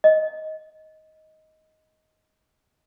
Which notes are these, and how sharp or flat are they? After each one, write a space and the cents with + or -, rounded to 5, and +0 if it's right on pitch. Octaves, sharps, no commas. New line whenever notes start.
D#5 +10